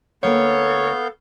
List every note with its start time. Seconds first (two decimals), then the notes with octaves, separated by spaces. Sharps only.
0.23 D2 A#3 B3 A4 C#5 F5 G5 G6